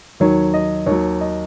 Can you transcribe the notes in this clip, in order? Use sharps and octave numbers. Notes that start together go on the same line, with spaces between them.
D#2 D#3 F#3 C#5
D#5
D#2 D#3 F#3 C#5
D#5